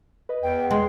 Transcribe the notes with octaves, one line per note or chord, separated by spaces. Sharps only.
B4 D#5
E2 G5
G#3 G5 C6